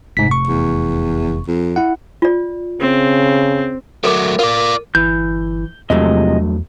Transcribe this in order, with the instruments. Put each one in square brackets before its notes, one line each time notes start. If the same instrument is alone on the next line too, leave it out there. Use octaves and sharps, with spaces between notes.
[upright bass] F1 F3 [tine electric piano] G#2 B6
[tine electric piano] C#6
[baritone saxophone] E2
F2
[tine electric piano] E4 F#5
[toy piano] F4 D5
[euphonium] C#3 [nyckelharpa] C4
[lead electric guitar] F#3 A3 [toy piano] A4 A#4 D6
[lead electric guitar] F4 D5 [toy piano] A#4
[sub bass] G1 [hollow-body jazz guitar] E3 [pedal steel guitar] G6
[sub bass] E2 [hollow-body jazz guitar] G2 F#3 A3 [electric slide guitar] C3 F3 G#3 [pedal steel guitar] D#5